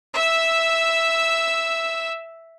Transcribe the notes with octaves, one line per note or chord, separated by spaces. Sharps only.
E5 E6